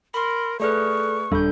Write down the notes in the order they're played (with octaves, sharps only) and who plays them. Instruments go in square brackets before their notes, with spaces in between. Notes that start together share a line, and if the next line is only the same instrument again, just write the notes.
[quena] A#4 [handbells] B5 C6
[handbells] A3 G#4 B4 [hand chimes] A4 D5 F6 [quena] C#6
[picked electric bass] D#1 G3 [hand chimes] D4 [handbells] A4 G6